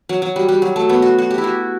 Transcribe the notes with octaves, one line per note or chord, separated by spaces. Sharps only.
F#3
F#3
G3
G3
F#3
A3
B3
F#4
F#4
G4
E4
F#4